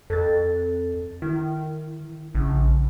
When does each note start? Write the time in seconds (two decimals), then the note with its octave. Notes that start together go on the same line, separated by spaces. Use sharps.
0.10 F2 A4 A6
1.22 D#3 E4
2.35 A#1 C#3